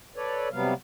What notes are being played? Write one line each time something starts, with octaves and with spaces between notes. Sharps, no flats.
A4 B4 C#5 D5
C3 F#3 G3 B3 F5